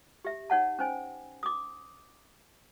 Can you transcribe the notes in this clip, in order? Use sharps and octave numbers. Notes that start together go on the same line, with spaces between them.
G4 E5
D#4 C#5 F#5 A5
C#4 C5 G#5
D6 D#6